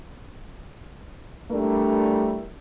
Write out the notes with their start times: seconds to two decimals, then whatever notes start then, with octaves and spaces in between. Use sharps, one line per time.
1.50 G3 A3 D4 E4 A#4